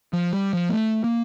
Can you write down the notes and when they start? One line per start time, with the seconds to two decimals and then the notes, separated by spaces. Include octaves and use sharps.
0.13 F3
0.33 G3
0.53 F3
0.69 A#3
0.73 A3
1.04 A#3